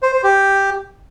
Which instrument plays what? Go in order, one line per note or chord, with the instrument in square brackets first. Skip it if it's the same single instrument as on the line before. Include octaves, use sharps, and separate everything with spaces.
[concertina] C5
C5
G4